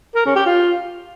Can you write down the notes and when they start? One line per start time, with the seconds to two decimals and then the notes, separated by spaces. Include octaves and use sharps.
0.15 A#4
0.25 C#4
0.36 G4
0.46 F4